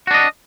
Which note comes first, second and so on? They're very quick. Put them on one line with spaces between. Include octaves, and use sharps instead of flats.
F#4 D4 D#5